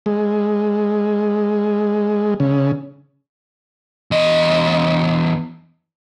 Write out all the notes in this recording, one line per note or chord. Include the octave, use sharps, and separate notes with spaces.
G#3
C#3
E2 D#5